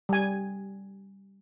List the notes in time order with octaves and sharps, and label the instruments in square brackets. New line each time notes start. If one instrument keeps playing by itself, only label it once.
[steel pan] G3 G#5